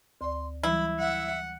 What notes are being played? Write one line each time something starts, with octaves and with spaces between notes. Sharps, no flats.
D2 D5 C6
E3 F#3 G3 E4 B5
E5 F#5